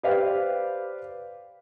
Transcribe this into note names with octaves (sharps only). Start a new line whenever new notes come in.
G4 B4 C5 D5 F5